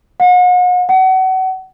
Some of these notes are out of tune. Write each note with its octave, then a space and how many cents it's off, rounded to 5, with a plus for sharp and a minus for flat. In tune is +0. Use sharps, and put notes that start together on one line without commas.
F#5 -40
F#5 +30